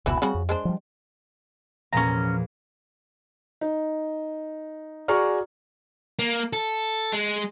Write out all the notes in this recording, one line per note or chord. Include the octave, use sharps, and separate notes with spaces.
F1 C#2 B2 E3 E4 F#4
C#3 G3 C4 F#4 B5
F2
G#3 D4 C5
F3 G3
E2 A#2 F3 C#4 A#5
D#4
F#4 G#4 D5 A#5 C#6 F6
A#3
A4
G#3